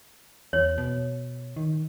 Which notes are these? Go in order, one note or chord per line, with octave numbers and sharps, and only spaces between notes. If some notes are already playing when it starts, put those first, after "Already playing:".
E2 C#5
B2
D#3